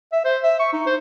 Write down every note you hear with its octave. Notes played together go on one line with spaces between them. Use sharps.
E5
C5
E5
C#6
D#4
C5